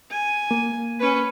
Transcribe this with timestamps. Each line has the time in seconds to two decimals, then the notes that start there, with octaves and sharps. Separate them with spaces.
0.10 G#5
0.51 A#3
0.99 C#4 B4